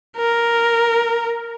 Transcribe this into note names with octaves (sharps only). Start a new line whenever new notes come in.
A#4